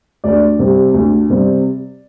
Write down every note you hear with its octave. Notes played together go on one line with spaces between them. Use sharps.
D2 D5
C3 G3
D2
C3 G3